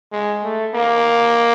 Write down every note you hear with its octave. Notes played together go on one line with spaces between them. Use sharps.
G#3
A3
A#3